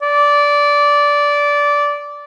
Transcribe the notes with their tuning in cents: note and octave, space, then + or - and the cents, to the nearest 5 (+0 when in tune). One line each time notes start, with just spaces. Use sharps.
D5 -15